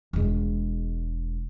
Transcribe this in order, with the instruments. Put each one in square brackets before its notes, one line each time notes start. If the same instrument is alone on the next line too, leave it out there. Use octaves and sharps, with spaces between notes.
[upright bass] E1 G#3